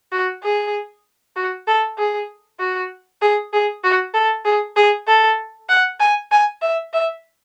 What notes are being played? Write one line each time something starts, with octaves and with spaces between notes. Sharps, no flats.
F#4
G#4
F#4
A4
G#4
F#4
G#4
G#4
F#4
A4
G#4
G#4
A4
F#5
G#5
G#5
E5
E5